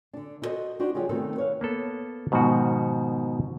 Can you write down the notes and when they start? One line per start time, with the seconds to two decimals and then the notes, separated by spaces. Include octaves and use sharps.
0.13 D3 D4
0.42 E4 F#4 A4 A#4 C5 D#5
0.79 D4 D#4 F#4 G4 C5
0.95 D3 F#3 G3 F4 G4 G#4
1.09 C3 D#3 A3 B3 C4 A4
1.36 B4 C#5 F5
1.61 A#3 B3 A4
2.32 G#2 B2 D#3 F3 F#4